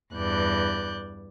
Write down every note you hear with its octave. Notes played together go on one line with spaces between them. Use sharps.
E2 G2 D5 F#6 G6